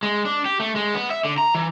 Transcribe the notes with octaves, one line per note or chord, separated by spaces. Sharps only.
G#3
D4
G4
A3
G#3
B3
E5
D3
A#5
E3